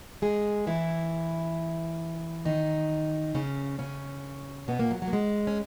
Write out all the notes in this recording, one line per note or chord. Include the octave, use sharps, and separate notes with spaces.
G#3 G#4
E3 E4
D#3 D#4
C#3 C#4
C#3 C#4
B2 B3
A#2 A#3
F#3
F#3
A#3
G#3
C#4